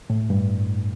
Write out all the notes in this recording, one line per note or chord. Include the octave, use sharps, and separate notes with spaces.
A2
G2